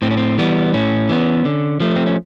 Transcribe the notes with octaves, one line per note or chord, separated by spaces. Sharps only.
A2 C4
C#4
C4
E3 G3 B3
A2 C#4
E3 G3 B3
D3
F3 A3
C4
C#4